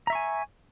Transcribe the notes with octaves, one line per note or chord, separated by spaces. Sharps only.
E5 G#5 A#5 C#6